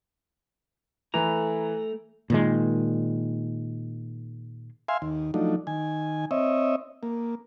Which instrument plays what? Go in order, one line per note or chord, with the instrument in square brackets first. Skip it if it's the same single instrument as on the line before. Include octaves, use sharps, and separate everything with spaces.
[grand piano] E3 [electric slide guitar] A3 A#5
[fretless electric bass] A#2 D#3 G#3
[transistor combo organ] E5 F5 G#5 C6
D#2
F3 F#3 A3 D4 D#4
D#3 G#5
C4 C#5 D#5 E5
A#3